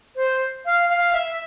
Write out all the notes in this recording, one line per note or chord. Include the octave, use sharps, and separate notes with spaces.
C5
F5
F5
E5